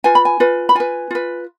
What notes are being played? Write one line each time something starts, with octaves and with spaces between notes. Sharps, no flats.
F4 B4 G#5
B5
G#5
F4 B4
B5
F4 B4 G#5
F4 B4